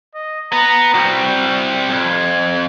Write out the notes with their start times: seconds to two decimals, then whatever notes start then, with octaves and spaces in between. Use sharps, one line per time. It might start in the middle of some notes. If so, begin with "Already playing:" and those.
0.15 D#5
0.52 B3 A#5
0.94 C2 G3 F#4
1.90 F2 G#6